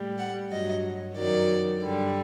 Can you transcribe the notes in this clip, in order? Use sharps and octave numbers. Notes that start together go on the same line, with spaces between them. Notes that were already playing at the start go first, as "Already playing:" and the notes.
Already playing: A2 G3
F#5
G2 F#3 D#5
F#2 D#3 F#3 D5
G2 D3 G3